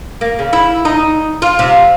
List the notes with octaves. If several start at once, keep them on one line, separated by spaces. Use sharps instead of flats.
A#3
C#3
E4
D#4
F4
C3